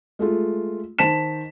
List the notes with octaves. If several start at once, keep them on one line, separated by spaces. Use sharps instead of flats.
G#3 A3 F4
D#3 C5 A5 B6 E7